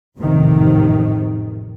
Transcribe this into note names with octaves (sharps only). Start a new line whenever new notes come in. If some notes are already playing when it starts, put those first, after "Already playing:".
A1 F2 G#2 C3 D#3